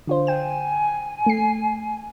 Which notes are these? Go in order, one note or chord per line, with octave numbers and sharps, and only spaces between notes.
D3 F4 C5
G5 G#5 E7
A3 C7